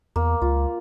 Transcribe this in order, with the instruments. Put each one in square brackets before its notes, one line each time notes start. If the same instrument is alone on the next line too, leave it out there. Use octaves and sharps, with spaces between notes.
[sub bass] E2 [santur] A#3
[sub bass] C#2 [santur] F4